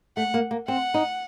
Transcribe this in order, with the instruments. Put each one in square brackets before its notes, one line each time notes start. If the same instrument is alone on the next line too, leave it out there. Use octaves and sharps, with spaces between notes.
[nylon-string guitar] A3 [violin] F#5
[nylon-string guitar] A#3
A#3
[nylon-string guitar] C4 [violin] F#5
[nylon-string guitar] D#4